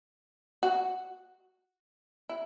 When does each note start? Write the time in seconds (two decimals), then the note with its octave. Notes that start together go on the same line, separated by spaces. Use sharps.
0.63 F#4
2.29 E4